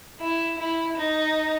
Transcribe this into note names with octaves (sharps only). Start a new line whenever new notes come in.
E4
E4
D#4